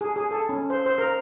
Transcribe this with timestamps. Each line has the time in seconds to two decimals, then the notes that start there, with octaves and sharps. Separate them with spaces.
0.01 G#4
0.16 G#4
0.31 A4
0.49 C#4
0.70 C5
0.86 C5
0.98 A#4